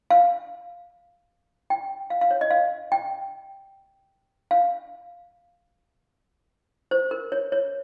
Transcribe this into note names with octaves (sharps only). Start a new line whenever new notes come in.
F5
G5
F5
F5
C#5
D#5
F5
G5
F5
C5
A#4
C#5
C#5